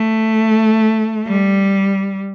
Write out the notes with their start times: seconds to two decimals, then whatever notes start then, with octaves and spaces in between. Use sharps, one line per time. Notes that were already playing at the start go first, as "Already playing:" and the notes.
Already playing: A3
1.27 G3